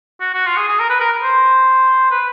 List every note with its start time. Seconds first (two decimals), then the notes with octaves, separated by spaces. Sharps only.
0.20 F#4
0.34 F#4
0.46 F4
0.57 G#4
0.68 G#4
0.79 A#4
0.90 B4
1.00 A#4
1.23 C5
2.11 B4